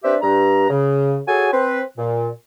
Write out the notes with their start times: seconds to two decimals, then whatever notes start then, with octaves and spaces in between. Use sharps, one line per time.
0.04 C4 D4 G4 B4 E5
0.22 G2 A#5
0.70 C#3
1.28 F#4 G#4 A4 C#5 G#5
1.53 C4 B4
1.98 A#2